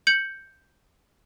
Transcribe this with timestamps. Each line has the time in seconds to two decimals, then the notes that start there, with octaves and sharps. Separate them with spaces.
0.07 G6 C#7 F#7